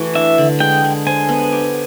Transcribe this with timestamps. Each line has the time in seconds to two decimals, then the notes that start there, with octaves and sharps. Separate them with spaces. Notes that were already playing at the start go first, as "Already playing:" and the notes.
Already playing: E3 A3 F#4
0.15 D4 E5
0.38 D3
0.60 G#3 G5
0.84 G#3
1.07 C5 G#5
1.29 B3
1.52 G4